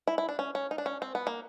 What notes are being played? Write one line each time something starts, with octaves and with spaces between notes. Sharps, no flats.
E4
E4
D4
C#4
C#4
D#4
D4
C#4
C4
B3
A#3